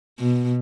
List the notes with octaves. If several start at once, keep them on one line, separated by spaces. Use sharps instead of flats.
B2